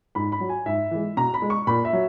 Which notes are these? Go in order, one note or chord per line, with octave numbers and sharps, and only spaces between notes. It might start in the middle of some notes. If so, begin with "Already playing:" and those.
G#2 B5
B5
F#3
G#5
G#2 E5
E3 G#3
B2 A#5
B5
G#3
C#6
A#2 B5
E5
F#3